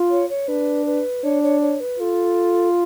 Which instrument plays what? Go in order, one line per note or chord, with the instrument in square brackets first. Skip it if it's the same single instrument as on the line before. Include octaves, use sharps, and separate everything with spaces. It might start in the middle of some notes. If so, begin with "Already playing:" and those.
Already playing: [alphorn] F4
[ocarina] C#5
C#5
[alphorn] D4 [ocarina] B4
[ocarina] B4
[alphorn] D4 [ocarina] C#5
[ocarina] C#5
C#5
B4
[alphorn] F4 [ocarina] A4